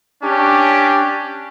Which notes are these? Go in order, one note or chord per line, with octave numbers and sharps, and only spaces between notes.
C#4 D4 G4